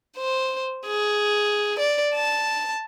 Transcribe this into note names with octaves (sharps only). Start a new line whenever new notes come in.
C5
G#4
D5
A5